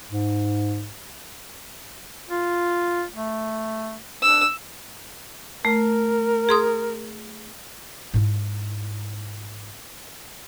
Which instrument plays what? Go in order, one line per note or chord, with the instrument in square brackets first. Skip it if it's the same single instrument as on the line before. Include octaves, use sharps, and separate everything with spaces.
[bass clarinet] G#2
[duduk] F4
A3
[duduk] D4 [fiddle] E6
[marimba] A3 [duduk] A#4
[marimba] G#4 C6 D#6
[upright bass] G#2 E4